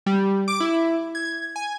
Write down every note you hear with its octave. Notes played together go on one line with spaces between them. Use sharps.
G3
D6
E4
G#6
G#5